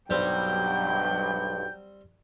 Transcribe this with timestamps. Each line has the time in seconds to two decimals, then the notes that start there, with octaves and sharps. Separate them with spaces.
0.10 B1 G2 F#3 G3 C4 G5 G6